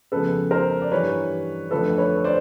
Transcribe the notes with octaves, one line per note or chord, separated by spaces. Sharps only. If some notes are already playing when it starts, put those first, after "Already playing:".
F2 C#3 F3 G#3 B3 A4 B4
A#4 C5
D5
G2 E3 G3 B4 C#5
F2 D3 F3 A3 A4 B4
B4 C#5
C5 D5